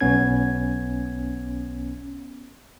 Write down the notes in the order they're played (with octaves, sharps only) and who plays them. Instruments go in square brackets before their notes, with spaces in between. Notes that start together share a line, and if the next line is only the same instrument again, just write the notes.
[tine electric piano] B1 B3 C#4 G#6